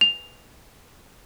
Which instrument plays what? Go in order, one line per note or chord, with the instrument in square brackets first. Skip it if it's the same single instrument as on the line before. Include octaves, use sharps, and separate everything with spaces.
[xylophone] F7